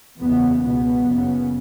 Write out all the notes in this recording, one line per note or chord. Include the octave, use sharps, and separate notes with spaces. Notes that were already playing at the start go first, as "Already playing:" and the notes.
F#1 E2 C#3 B3
C#2 B2 B3
F#1 F#2 C#3